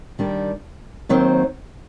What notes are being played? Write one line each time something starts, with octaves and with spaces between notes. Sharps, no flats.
D#3 G3 D4 G4
D#2 D#3 F#3 C4